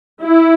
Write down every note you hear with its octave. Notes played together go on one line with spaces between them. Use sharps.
E4